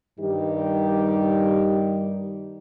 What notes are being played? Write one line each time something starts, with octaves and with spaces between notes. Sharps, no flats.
G2 D#3 G3 D#4 G4